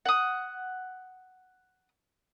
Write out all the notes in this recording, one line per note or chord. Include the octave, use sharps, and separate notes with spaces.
F#5 D#6